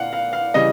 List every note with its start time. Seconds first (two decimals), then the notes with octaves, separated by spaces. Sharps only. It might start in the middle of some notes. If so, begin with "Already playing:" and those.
Already playing: A#2 F5 F#5
0.13 F5
0.33 F5
0.54 C#3 E3 G3 D#5